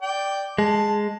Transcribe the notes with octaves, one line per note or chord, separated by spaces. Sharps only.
D5 G5
G#3 A5